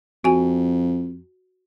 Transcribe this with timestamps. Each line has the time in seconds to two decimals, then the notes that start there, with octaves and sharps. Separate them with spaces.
0.24 F2 F#4 G#5